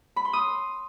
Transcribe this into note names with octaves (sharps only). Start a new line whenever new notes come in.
B5
C6
D#6